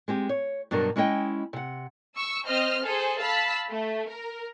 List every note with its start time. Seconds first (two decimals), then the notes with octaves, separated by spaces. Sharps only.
0.08 G#3 C4 G4
0.29 C#5
0.71 G2 B2 F#3 D4 A#4
0.96 G#3 C#4 E4 D#5 G5
1.53 C3 F#5
2.15 C#6 E6
2.45 C4 C5 D#5 F6
2.84 G#4 A4 C5
3.21 F5 A5 B5 E6
3.69 A3
4.09 A#4